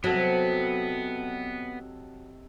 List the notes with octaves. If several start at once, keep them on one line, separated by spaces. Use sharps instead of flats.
C3 F#3 B3 A4 D#5